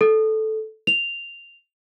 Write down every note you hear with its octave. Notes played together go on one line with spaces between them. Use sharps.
A4
F7